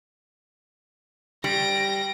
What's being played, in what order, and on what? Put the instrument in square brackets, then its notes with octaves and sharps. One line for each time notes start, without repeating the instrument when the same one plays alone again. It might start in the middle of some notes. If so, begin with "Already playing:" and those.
[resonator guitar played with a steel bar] G3 [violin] A#6 D7